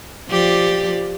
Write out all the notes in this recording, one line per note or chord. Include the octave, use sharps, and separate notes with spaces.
F3 G4 D5